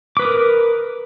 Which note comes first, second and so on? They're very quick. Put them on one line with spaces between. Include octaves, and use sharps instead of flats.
D6 B4 D#6 A#4